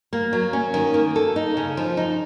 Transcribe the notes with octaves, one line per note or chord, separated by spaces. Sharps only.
A#3
F#3
C#4
D#3
A#3
A4
D#4
C#3
F3
D#4